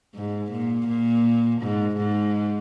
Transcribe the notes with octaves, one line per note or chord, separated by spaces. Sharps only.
G#2
A#2
A#2
G#2
G#2